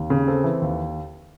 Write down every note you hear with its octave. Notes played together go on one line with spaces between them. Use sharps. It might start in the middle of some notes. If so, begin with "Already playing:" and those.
Already playing: D#2
C#3
C4 A4
E3
D#2